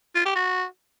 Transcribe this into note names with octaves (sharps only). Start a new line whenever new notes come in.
F4
G4
F#4